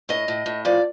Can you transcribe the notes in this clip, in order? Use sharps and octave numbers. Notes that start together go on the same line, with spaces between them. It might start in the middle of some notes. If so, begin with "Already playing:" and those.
A2 D#5
A2
A2
F3 D5